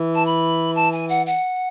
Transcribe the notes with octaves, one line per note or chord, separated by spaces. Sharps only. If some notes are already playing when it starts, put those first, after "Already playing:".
Already playing: E3
A5
B5
A5
G#5
F#5
F#5